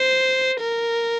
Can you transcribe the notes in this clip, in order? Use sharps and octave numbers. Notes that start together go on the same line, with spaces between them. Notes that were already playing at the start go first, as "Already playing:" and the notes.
Already playing: C5
A#4